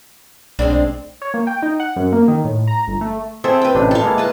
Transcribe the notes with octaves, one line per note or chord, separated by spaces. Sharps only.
B1 G#3 C4 D4
C#5
A#3
G5
D#4
F#5
F#2
A#3
D#3
A2
A#5
G1
A3
C4 G#4 A4 E5
B4 G5
A1 C3 D4
A4 F5
G#3 A#3 E4
B4 A5